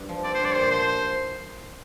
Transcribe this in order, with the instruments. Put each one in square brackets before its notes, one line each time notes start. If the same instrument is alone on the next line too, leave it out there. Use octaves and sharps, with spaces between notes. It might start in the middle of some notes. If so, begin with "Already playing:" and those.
Already playing: [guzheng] G2
F3
[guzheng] C4 [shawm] D5
[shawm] C5
[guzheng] G2 [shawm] D5
[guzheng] A#2 [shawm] C5
[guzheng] F3 [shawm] C5